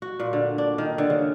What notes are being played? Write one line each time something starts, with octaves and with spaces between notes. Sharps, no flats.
F#4
A#2
D3
D4
D#3
D3
C#3